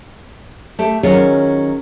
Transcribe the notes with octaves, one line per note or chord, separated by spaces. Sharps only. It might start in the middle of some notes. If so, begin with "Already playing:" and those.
A3 G4
D#3 F#3 C#4 F4 G#4 C#5